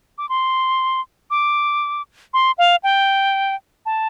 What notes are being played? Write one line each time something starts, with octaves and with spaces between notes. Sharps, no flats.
D6
C6
D6
C6
F5
G5
A5